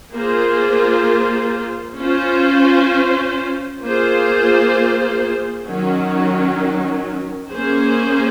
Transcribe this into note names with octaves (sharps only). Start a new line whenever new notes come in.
A#3 F4 G#4 C5
C#4 F4 C5
A#3 F4 G#4 C5
D#3 F#3 C#4
A#3 C#4 G#4 C5